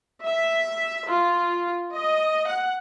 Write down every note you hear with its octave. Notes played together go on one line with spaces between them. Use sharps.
E5
F4
D#5
F#5